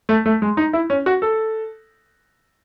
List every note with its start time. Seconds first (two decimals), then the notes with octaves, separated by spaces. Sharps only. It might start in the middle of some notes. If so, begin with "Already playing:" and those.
0.09 A3
0.26 A3
0.42 G#3
0.57 D#4
0.73 E4
0.90 C#4
1.06 F#4
1.22 A4